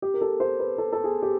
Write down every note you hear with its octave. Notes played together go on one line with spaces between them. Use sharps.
G4
A#4
A4
C5
B4
A4
A4
G#4
G4